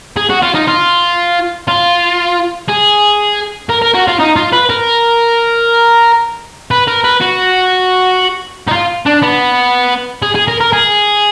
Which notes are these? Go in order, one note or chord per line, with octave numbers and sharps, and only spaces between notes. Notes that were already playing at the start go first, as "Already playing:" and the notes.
G#4
F#4
F4
D#4
F4
F4
G#4
A#4
A#4
F#4
F4
D#4
F4
B4
A#4
B4
A#4
B4
F#4
D#4
F4
D4
B3
G#4
G#4
A#4
A#4
G#4